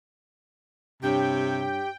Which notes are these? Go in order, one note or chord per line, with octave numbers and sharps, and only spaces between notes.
G2 C3 G4 C#5 G5